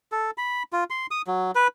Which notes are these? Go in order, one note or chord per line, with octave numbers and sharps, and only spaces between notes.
A4
B5
F4
C6
D#6
F#3
B4